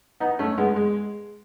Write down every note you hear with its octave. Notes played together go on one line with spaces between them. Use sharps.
B3 D#4
A3 C#4
G#3 B3
G#3